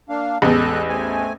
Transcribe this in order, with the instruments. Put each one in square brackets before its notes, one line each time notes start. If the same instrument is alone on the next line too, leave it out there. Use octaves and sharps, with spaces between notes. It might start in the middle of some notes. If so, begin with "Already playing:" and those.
[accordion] A#3 D4 F5
[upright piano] A1 E2 [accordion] G#3 A4 F#6
[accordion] A3 C4 G#5